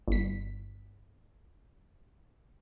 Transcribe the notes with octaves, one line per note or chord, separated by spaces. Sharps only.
G1 B6